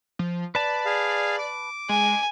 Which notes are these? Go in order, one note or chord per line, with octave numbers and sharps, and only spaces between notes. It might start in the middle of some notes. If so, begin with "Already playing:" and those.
F3
B4 D5 A5
G#4 F5
D6
G#3 G#5